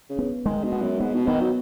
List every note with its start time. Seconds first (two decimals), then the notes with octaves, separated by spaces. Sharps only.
0.10 C#3
0.18 B3
0.45 D#3 G#3
0.64 B2
0.72 B3
0.82 F#2
1.00 G#2 B3
1.14 B2
1.27 D#3 B3
1.41 F#3